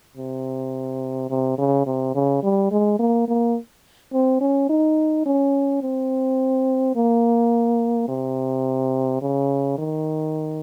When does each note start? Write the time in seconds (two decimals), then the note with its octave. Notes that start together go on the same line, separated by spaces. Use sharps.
0.17 C3
1.30 C3
1.58 C#3
1.86 C3
2.15 C#3
2.43 G3
2.71 G#3
2.99 A#3
3.28 A#3
4.13 C4
4.41 C#4
4.70 D#4
5.26 C#4
5.82 C4
6.96 A#3
8.08 C3
9.22 C#3
9.78 D#3